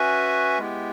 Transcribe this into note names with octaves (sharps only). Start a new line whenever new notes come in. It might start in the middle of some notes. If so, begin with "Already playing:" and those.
Already playing: C#4 F#4 B4 E5 G#5
G#3 B3 E4 G4